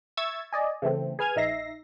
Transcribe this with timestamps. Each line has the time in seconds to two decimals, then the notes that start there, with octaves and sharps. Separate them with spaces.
0.17 E5 C#6 E6 G#6 A6
0.53 D5 D#5 G#5
0.82 C#3 E3 A3 C4
1.19 G#4 B4 F6 G#6 D#7
1.36 A#1 D#4 E5 A#6 C7